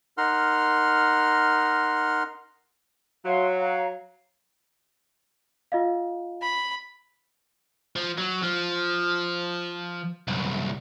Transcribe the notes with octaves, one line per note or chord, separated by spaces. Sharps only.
D#4 A#4 F#5 C6 F6
F#3 E5 F5 C6
C#5 F5 A#5
F4 D#5 F5
B5
F3
F#3
F3
C2 F#2